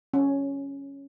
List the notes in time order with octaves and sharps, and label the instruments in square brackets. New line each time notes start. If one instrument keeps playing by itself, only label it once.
[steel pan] C#4